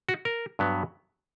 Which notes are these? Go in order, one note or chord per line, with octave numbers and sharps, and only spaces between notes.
F#4
A#4
G2 F#3 B3